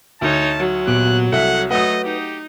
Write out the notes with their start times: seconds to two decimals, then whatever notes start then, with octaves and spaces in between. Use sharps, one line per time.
0.21 D2 D#4 C#5 A5
0.58 F#3
0.87 A#2 B3 G4 F#6
1.32 C2 A4 E5 F#5
1.71 F#3 A3 B4 D#5 F#5 D#6
2.04 D#4 G4